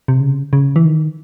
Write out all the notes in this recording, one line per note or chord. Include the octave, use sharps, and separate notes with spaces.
C3
C#3
C#3
E3
D#3